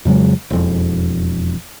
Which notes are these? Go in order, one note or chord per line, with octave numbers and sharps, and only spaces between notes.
F2 C#3 F#3 G#3
E1 F2